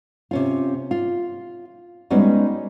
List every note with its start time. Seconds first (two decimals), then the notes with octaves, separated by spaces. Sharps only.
0.31 C3 C#4 F4
0.91 F4
2.10 G3 G#3 B3 C#4 D#4 F#4